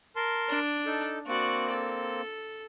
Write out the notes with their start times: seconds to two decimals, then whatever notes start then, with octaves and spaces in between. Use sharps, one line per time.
0.16 A#4 A5 C6
0.49 D4
0.85 D#4 A4
1.27 A#3 C4 F#4 D5
1.71 A4